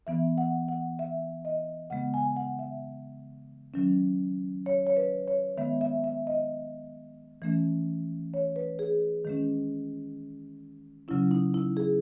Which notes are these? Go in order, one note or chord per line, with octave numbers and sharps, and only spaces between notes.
E3 B3 E5
F#5
F#5
E5
D#5
C#3 G#3 B3 F#5
G#5
F#5
E5
D#3 F#3 C#4
C#5
C#5
B4
C#5
D#3 G#3 B3 E5
E5
E5
D#5
E3 A3 C#4
C#5
B4
G#4
D#3 G#3 C#4
C#3 F#3 C#4 E4
D#4
E4
G#4